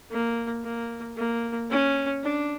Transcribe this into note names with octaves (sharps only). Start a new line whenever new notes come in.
A#3
A#3
A#3
C#4
D4